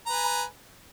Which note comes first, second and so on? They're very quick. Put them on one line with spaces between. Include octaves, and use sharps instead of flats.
A#5 B4 G#5